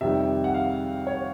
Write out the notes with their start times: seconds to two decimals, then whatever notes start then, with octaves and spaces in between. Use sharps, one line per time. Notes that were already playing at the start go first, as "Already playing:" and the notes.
0.01 F2 C3 D#3 G3 E5
0.44 F#5
0.54 F5
1.07 C#5